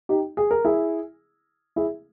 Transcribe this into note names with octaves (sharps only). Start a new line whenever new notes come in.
D#4 G4
G#4
A#4
E4 G#4
E4 G#4